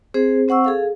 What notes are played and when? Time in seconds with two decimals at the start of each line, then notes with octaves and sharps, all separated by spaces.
0.14 C4 G#4 C5
0.48 C4 C5 F#5 C#6 E6
0.65 G#4 A4 F5